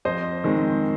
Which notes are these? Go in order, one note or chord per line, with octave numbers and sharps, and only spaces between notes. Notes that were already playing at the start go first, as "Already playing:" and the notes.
F2 C5 D#5
D#3 G#3 C4